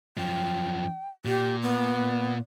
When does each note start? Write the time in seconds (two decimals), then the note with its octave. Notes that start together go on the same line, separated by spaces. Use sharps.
0.17 F#2 F3 G5
1.25 A#2 G4
1.62 B3